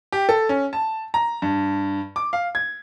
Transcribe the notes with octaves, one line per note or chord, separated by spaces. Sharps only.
G4
A4
C#4
A5
A#5
G2
D6
F5
G#6